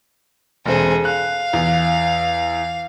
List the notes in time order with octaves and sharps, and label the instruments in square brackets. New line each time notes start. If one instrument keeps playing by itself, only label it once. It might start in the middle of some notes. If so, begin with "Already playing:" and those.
[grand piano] E1 C4 [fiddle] G#4 A4
[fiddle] F5 [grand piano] F#6
[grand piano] E2